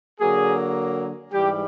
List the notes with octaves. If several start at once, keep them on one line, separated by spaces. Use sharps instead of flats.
D3 F#3 A#3 G#4
G#2 E3 G3 G4